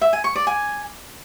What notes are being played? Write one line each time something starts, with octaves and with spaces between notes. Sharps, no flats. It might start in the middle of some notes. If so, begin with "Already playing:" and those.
E5
G#5
C#6
D5
G#5